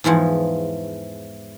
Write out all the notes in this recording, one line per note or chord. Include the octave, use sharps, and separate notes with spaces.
E2 G#2 E3 F3